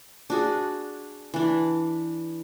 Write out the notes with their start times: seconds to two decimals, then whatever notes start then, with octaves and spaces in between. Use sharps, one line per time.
0.30 D4 F#4 G#4
1.34 E3 D4